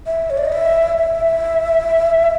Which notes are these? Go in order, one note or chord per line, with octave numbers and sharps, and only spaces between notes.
E5
C#5
D5
D#5
E5
E5